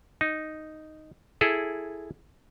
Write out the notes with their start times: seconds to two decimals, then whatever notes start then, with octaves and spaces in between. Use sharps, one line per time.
0.21 D#4
1.41 E4 G#4 A4